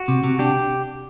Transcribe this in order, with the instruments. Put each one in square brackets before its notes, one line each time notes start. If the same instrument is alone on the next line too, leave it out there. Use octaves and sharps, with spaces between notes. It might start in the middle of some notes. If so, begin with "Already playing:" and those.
Already playing: [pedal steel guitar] F#4
[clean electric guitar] C3
C3
[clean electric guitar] D4 [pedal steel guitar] G4